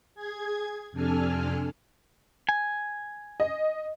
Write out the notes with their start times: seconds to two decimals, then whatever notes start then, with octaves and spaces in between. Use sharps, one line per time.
0.15 G#4 G#6
0.92 F2 C3 D4 A4 G#5 F6
2.49 G#5
3.40 D#5